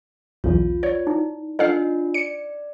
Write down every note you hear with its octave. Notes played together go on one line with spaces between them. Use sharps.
B1 E2 F4
C#5 D5
D#4 E4
D4 F4 A4 D#5 F5
D5 C#7